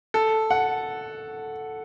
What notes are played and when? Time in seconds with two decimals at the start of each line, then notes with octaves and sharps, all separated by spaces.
0.14 A4
0.51 F#5